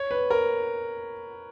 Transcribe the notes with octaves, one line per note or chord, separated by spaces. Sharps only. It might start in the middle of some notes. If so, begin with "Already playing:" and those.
Already playing: C#5
B4
A#4